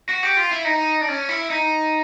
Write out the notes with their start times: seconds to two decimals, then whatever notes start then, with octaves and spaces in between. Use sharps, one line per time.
0.09 F#4
0.23 G4
0.37 F4
0.51 E4
0.65 D#4
1.01 D4
1.08 C#4
1.29 E4
1.50 D#4